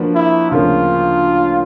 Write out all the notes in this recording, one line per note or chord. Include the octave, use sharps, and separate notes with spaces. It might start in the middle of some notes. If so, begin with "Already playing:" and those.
Already playing: F3 A#3 D4 F#4 B4
E4
D2 C#3 F3 A#3 C#4 F4